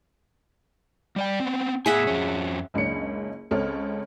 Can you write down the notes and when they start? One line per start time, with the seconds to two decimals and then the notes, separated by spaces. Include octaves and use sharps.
1.16 G3 D5 G5
1.40 B3 C4
1.86 A2 B3 G#4 E5 F#5 G#5
2.07 F2 C#4
2.74 F#1 C#2 D4 C#5 C#7
3.51 C#2 C4 A4 C#5 F6